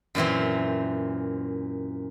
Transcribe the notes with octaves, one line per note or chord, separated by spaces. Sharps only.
F#2 A#2 E3 C4